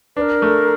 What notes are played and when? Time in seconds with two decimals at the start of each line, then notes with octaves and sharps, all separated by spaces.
0.16 D4 A#4 B4
0.42 A3